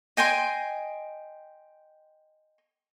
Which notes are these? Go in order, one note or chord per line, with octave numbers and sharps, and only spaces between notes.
D#5 G5 G#5 C6